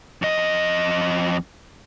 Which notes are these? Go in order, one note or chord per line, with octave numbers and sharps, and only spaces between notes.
F2 D#5